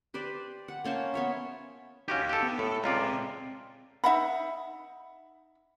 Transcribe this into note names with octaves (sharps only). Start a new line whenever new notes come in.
G4 B4 C5 D5
F#5
A#3 C#4 C5 A5
B3 C#5 E5
C#4 D#4 F#4 G4 F5
G4 A4
B3
A2 A4
C#2 C4 F4 D5 A#5
D#4 E5 F#5 B5